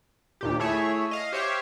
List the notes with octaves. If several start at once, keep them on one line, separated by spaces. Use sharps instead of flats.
D#2 A#2 G4
A3 E4 G#4 C#5 E5
D#5 F5 D#6
G4 C5 C#5 E5 F5 G5